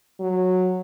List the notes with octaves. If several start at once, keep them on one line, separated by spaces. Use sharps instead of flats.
F#3